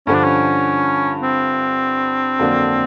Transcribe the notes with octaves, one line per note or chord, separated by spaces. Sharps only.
G2 D3 F3 C#4
D4
C#4
C4
F2 D3 F#3 A#3 D4